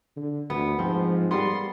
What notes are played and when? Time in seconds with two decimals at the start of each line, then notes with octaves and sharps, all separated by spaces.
0.17 D3
0.50 D2 B3
0.79 G#2 F3 C4
1.31 G3 A#3 B3 C6